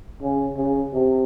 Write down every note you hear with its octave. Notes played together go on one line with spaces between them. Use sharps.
C#3
C#3
C3